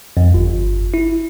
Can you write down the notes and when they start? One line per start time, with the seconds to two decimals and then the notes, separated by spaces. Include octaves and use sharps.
0.17 F2
0.34 G1
0.94 E4